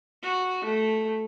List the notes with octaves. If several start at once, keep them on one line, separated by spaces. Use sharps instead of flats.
F#4
A3